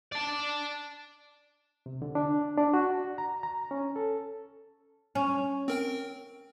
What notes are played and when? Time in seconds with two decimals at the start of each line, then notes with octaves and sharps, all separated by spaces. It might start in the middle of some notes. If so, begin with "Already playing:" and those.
0.12 D5 A5
1.86 C3
2.02 D3
2.15 D4
2.58 D4
2.74 F#4
3.18 A#5
3.43 A#5
3.71 C#4
3.96 A4
5.15 C#4
5.68 C4 A#4 G5